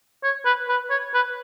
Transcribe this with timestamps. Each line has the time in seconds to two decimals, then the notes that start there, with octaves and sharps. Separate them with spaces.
0.24 C#5
0.45 B4
0.69 B4
0.90 C#5
1.14 B4